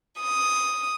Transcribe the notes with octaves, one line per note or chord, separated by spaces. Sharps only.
D#6